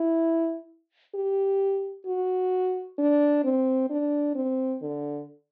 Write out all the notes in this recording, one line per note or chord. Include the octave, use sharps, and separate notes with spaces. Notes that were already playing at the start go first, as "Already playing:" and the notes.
Already playing: E4
G4
F#4
D4
C4
D4
C4
D3